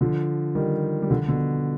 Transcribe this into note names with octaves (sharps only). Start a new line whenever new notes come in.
D3 F3
D#3 G3
G3
D3 F3
B2 D3